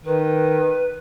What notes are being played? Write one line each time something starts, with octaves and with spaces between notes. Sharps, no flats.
D#3 B4